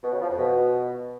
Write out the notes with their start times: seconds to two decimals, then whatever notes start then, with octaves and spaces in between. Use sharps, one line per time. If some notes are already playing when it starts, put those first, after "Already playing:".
0.03 B2
0.12 C#3
0.21 F3
0.29 F2
0.38 B2